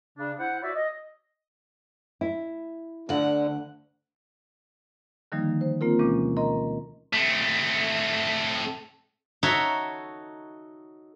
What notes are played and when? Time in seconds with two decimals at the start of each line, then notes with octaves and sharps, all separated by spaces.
0.18 C#3 D4
0.39 E4 C5 F#5
0.63 F#4 C#5 D5 E5
0.75 D#5
2.21 E4
3.09 D2 D3 F#5
5.32 D3 D#3 F3 G3 A#3 D#4
5.61 C5
5.81 A#3 C4 F4 A#4
5.99 D2 B2 E3 G#3 C#4 D6
6.37 A#4 D#5 A#5 C6
7.13 A3 C4
9.43 D#4 F#4 A4 C#5 E5